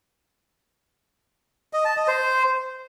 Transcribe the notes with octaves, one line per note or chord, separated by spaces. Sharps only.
D#5
A5
D#5
C5